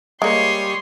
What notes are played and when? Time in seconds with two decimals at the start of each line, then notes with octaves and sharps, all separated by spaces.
0.22 G3 G#3 A#3 C#5 C6 D#6